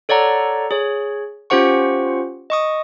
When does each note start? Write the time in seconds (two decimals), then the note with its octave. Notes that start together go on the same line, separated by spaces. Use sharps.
0.09 A4 C#5 D5 F#5 A#5
0.71 G#4 C#5
1.50 C#4 F4 G4 C5 F#5 C#6
2.50 D#5 C#6 D#6